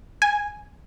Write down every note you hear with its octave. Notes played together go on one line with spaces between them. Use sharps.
G#5